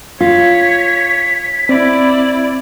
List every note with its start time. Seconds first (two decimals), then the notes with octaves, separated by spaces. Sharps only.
0.21 F4 C#5 B6
1.69 C4 E4 D5